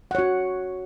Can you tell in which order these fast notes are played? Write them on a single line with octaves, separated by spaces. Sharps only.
F#5 C#5 F#4